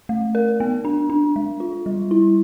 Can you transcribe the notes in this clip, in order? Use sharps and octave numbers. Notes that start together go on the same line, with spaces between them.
A3
A#4
B3
D4
D4
G#3
F4
G3
E4